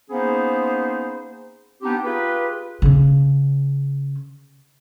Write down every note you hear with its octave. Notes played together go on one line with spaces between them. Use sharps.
A#3 B3 C#4 D#4 G#4 C5
B3 C4 D4 D#4 G4
F4 G4 G#4 B4
C#3 C#4